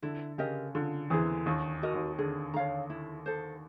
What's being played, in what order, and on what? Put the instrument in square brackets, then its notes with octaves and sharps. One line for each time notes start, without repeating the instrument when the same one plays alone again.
[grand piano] D3 [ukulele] E4
[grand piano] C#3 [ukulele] G4 A#4 D#5
[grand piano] D3 [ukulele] F4
[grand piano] E2 E3 [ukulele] G#4 C5
[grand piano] D#2 D#3 [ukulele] D4
[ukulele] F#4 A#4 D#5
[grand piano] D#2 D#3
[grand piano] D3 [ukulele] G#4
[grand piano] D3 [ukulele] C#5 F5 A#5
[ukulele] E4
A4 C5